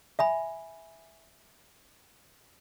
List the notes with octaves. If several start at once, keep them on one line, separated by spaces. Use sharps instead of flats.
E5 G#5 B5